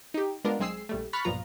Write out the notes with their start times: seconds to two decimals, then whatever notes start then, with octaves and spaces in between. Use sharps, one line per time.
0.14 D#4 G4
0.44 G#3 B3 D4 F4 A#4
0.59 B1 G#3 C4 G#4 E6 C7
0.89 A#1 G3 A3
1.13 B5 C#6 F6 F#6 A6 B6
1.25 B1 G2 A#2 F3 F4 A#5